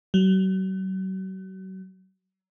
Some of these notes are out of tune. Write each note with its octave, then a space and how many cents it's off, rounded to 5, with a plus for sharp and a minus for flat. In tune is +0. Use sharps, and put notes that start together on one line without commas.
F#3 +40